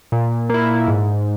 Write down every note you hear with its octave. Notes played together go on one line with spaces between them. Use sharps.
A#2
A#3 E4
G#2